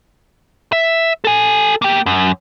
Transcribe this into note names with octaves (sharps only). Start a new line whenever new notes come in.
E5
A4 G#5
A#3 G5
F#2